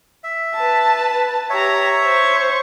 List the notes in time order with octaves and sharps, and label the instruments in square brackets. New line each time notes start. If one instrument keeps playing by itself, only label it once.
[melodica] E5
[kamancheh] B4 A5
[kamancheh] G4 A#5 [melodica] C#5 E5
[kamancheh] C5 C#6